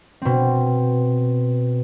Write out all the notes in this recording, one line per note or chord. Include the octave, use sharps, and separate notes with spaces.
B2 C4